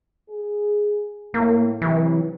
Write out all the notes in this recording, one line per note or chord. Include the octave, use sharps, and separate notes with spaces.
G#4
A2 A#3
C3 E3 F#3